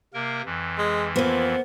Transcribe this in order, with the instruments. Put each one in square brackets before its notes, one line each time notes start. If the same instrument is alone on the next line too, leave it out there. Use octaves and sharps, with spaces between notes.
[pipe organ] C3 A#3 A#4
F2 E3
[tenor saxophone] G#3
[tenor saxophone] F3 [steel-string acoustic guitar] A#3 B3 [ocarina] C5